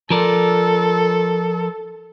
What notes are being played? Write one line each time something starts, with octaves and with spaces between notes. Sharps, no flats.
F3 A4 A#4 D5